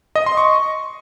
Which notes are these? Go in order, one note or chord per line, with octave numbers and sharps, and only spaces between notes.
D#5
C6
C#6